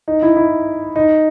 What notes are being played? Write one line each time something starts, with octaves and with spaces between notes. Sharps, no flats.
D#4
E4
E4
D#4